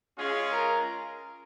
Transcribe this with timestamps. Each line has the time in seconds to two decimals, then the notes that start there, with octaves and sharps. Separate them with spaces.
0.18 G#3 C#4 F4 G#4
0.52 A#4